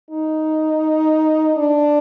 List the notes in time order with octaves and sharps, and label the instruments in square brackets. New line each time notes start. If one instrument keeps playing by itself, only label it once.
[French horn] D#4
D4